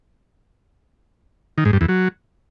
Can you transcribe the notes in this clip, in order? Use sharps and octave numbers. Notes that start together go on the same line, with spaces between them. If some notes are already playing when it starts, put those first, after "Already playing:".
D#3
G#2
G2
E2
F#3